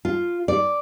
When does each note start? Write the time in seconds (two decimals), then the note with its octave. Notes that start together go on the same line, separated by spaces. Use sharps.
0.05 F4
0.48 D5